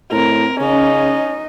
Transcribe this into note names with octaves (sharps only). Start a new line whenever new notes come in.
A2 C4 A#4
C#3 C#4 D#4 D#5